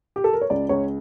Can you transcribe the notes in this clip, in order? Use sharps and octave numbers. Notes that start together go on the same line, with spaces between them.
G4
A4
A#4
C#5
C#2 D5
C#2 C#5